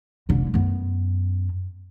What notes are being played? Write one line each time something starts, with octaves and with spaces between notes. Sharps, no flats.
F1 D3
F#2 B3